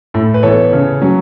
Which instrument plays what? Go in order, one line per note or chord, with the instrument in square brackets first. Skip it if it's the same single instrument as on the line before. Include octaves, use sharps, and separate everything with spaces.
[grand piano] A2 A4
B4
E3 B3 A4 C#5
C#3
F#3 C#4